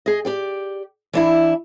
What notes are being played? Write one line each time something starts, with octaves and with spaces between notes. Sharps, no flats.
G#4 D#5
G4 D5 G5
E3 D4 E4